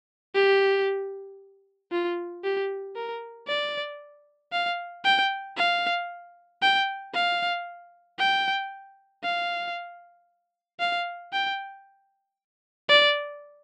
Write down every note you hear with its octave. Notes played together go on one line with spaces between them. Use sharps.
G4
F4
G4
A#4
D5
F5
G5
F5
G5
F5
G5
F5
F5
G5
D5